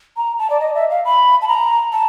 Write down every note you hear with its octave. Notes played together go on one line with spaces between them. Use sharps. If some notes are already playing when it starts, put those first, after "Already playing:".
A#5
A5
D5
D#5
E5
F5
B5
A5
A#5
A5